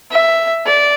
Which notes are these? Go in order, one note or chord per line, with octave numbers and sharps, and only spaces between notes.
E5
D5